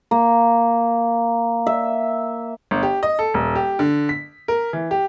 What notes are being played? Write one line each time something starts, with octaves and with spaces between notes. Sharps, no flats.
A#3
E5
G1
G4
D#5
A4
D#1
G4
D3
B6
A#4
E3
G4